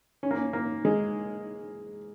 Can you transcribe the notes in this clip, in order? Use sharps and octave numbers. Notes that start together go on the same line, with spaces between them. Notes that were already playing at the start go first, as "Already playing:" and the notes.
C#4
A#3
C#4
A#3
G#3